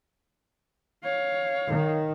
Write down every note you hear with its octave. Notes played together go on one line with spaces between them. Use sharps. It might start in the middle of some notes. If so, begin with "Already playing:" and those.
C#5 F5
D#3